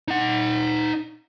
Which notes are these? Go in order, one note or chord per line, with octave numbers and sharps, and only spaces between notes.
D#4 F#5